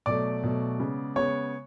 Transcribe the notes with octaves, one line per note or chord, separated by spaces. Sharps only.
B2 F#3 A3 D5 D6
B2 F#3 A3
C#3 G#3 B3
C#3 G#3 B3 C#5 C#6